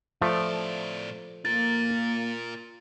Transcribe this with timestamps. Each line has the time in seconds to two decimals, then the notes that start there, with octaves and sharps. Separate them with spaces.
0.21 A2 F3 A3 D5
1.45 A#3 F4 A#4 A6